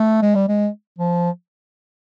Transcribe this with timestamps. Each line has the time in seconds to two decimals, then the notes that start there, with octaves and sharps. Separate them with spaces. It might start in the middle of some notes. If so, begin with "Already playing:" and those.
Already playing: A3
0.22 G#3
0.35 G3
0.49 G#3
0.99 F3